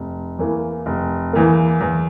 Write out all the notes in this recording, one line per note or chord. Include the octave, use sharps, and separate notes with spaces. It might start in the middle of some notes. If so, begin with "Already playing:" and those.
Already playing: F1
E2 E3 A#3
F1
E2 E3 A#3
E2